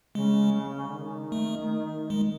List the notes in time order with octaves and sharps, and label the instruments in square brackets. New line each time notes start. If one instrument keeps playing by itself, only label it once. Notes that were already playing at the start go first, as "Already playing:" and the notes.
[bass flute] C#3 [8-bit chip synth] G#3
[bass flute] D3
D#3
[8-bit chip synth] A3
G#3